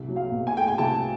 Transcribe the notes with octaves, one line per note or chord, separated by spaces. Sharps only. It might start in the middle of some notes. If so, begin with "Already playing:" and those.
Already playing: C2
F#3
F5
B2
G#5
A3 G5
G#5
C2 A5